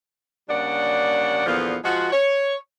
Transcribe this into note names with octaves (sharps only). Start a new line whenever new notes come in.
C#3 G3 A#3 D4 D5 F#5
E2 A#2 D3 F3 B3 F4
F3 G#3 F4 F#4
C#5